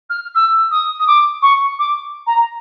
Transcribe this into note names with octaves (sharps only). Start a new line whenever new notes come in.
F6
E6
D#6
D#6
D6
C#6
D6
A#5